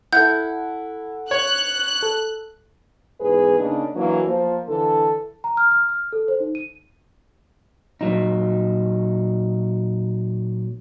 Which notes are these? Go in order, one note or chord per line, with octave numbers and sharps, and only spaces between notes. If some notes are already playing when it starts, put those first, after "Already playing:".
E4 A4 F#5 G6
C#5 F#6
A4
E2 G#2 G#4 B4
C#3 A#3 D4 D#4
E3 F#3 A#3 D4
F3 A#3
D3 E3 A4
A#5
F6
F6
F6
A4
C5
D#4
D#7
A#2 F#3 D#4